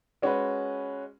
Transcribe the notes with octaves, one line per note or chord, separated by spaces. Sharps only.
G#3 C#4 F#4 B4